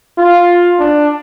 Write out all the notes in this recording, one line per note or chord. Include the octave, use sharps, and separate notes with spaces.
F4
D4